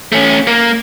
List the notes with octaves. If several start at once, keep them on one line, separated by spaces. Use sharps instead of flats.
A3 C#4
A#3